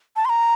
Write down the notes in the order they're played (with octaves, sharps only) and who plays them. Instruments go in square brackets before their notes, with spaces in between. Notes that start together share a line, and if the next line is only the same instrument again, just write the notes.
[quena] A5
C6
A#5